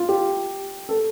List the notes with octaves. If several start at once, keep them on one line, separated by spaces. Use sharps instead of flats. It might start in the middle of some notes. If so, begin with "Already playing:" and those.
Already playing: F4
G4
A4